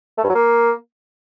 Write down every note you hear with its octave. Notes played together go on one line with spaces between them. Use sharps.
A3
G2
F#3
A#3